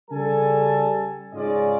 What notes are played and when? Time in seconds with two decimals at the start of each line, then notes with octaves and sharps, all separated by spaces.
0.11 C#3 G3 A4 G#5 A5
1.34 G#2 C#3 C#4 F4 D5 D#5